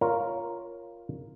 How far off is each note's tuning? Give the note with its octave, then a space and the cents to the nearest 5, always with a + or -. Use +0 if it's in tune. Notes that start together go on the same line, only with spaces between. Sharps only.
F4 +0 A#4 +0 C#5 +0